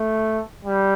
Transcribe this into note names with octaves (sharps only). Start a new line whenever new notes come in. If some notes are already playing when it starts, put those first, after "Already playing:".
Already playing: A3
G3